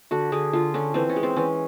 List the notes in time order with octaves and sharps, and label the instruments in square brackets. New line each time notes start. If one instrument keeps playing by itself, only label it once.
[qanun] D3 F#4
D3 G#4
D3 F4
D3 C#4
E3 C4
C#4
G#3
C4
E3 C#4